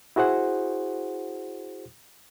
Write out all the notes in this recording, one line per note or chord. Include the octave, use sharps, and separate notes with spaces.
E4 F#4 G#4 C5 F#5